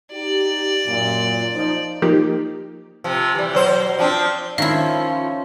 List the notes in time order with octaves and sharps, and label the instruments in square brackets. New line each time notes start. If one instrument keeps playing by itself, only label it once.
[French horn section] D#4 G4 [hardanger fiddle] D5
[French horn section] F#2 A#2
F3 D#4
[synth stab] F3 A#3 D#4 G4
[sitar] C3 F3
E3 G3
B2 F#3 C5
F3 C4 D4
[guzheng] D#3 E4 [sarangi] F3 [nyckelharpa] C#4 [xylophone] F5